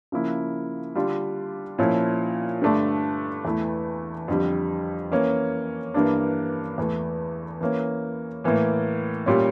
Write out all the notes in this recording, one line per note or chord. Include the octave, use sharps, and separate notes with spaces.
C#3 F3 A#3 E4
D3 G3 D4 F4
A#2 F3 C#4 E4
G2 D3 A3 D4
E2 E3 A3 E4
F2 D3 G3
E3 A#3 C#4
G2 E3 A#3 D4
E2 E3 A3
E3 A#3 C#4
A2 E3 A#3
A#2 G3 C#4